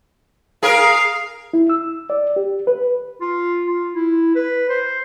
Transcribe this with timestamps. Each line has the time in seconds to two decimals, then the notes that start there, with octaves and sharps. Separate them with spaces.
0.63 G#4 A#4 F5
1.53 E4
1.70 E6
2.10 D5
2.36 G4
2.67 B4
3.21 F4
3.67 F4
3.94 E4
4.35 B4
4.69 C5